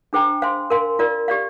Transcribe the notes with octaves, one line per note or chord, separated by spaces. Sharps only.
D4 G#4 C5 G5 A#5
C5 F5 G#5 C6
A#4 F5 G#5 C6
F4 A#4 D5
G4 D5 F5